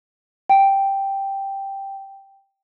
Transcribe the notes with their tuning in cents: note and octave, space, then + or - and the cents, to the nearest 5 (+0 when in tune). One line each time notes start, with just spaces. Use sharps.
G5 +0